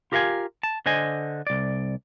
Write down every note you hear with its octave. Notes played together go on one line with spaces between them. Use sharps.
F4 G4 A#4 E5 F5 G#5
A5
D3 C5 D#5 G#5
C2 D5